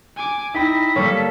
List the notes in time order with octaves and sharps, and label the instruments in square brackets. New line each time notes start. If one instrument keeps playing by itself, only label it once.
[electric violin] G#5 D6
[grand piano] D#4 G5 B5 [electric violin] E4 A#6 [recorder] B6
[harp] G3 A#3 [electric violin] A4 [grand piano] C#5 C#6